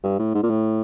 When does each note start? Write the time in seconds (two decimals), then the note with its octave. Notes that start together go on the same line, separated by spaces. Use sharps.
0.04 G2
0.19 A2
0.34 G#2
0.43 A#2
0.50 A2